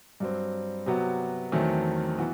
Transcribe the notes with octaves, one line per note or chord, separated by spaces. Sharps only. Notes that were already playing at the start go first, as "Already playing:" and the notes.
G2 F#3 C4
C3 F#3 B3 F#4
E2 D#3 F#3 A3 C4
E3 B3 F#4